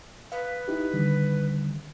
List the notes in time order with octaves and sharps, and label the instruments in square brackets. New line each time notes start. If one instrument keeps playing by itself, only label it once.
[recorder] B4 [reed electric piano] F5
[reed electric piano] D#4 E4 G4
D3 D#3 G3